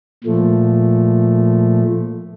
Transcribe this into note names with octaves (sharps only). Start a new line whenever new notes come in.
A#2 F3 A3